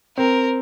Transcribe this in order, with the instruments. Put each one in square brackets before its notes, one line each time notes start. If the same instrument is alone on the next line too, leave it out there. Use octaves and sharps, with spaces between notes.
[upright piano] C4 [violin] A#4